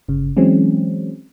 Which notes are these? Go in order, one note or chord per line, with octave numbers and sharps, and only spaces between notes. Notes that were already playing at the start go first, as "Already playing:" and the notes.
G1 C#3
E3 F#3 G#3 C4 C#4